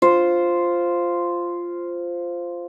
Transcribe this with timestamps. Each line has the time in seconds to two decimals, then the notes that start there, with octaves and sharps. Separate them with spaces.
0.02 F4 C5